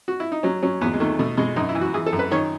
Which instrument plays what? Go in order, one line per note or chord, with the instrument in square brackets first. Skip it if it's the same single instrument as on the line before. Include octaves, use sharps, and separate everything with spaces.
[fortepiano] F#4
E4
D#4
F#3 C#4
F#3 C#4
E2 B3
G#3
D#3 A3
B2 A3
B2 G#3
F#2 D#4
E4
E3
F#4
E3 G#4
A4
F#2
B4
D#3 C#5